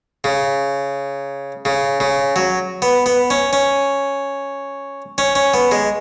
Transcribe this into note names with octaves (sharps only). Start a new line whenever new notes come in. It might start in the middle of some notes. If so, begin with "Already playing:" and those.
C#3
C#3
C#3
F#3
B3
B3
C#4
C#4
C#4
C#4
B3
G#3